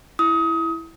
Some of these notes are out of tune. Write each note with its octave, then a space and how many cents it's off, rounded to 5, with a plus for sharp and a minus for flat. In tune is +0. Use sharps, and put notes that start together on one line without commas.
E4 +0 D#6 +25